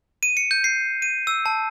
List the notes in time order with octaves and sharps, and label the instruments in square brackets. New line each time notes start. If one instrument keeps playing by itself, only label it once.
[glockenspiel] D#7
C#7
G6
C7
D#7
E6
A5